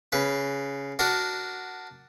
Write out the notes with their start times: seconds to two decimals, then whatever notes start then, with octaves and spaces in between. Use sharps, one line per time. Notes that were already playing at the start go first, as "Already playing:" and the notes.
0.12 C#3 B4
0.99 D4 F#4 A#4